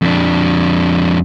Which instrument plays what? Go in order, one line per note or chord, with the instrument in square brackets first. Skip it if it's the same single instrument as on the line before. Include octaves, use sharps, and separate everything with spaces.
[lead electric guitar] F2 D4